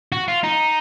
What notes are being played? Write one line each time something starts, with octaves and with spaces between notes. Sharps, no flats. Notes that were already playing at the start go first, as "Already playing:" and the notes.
F#4
F4
D#4